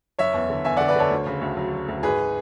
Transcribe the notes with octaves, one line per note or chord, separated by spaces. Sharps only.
F#1 C#5 E5
E2
D3
E2 E5 G#5
D5 F#5
D3
B4 D5
D3 A4 C#5
D2
C#3
D2
F#3
F#3
D2
G#1 G#4 B4